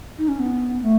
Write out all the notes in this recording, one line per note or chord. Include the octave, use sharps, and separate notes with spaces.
D#4
C#4
B3
A3